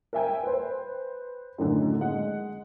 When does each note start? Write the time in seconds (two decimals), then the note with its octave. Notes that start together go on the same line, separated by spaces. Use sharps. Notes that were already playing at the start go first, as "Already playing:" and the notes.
0.13 A#4 E5 G5 G#5
0.43 B4 C5
1.58 F#2 A2 D3 D#3
2.01 G#3 F#5